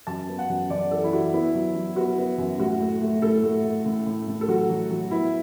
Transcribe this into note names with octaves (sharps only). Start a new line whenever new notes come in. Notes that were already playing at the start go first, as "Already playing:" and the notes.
F#2 A5
B3
F#5
F#2
F#2 D5
E3 A4
E4
E3 F#4
B3 E4
F#3
F#3
B3 F#4
B3
F#2
A2 F#4
A3
A3
A2 A4
A3
A3
A2
A2
A2
A4
F#3 F#4
F#3
F#3
B3 E4